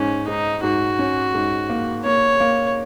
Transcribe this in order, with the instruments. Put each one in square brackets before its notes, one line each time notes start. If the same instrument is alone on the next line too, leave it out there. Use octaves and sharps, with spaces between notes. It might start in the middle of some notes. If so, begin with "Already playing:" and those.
Already playing: [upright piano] G#2 [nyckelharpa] C#4
[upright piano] G#2 [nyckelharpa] D#4
[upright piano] G#2 [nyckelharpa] F#4
[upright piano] C#4
G#2
A#3
[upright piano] A#3 [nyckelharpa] C#5
[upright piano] A#3